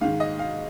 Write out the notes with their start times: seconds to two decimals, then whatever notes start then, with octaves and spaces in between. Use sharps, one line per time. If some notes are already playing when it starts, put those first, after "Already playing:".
0.01 G#2 D#3 F5
0.20 D#5
0.39 F5